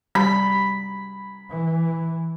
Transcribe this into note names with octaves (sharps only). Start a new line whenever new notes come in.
G3 A5 B5
E3